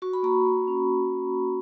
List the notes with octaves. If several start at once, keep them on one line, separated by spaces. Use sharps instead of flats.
F#4 C#6
B5
A#3 A#5 C#6
A#3
C#4